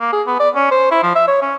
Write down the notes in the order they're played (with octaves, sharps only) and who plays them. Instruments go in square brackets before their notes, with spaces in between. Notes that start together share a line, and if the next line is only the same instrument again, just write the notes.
[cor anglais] A#3
G#4
B3
D5
C#4
C5
E4
F3
E5
C#5
C#4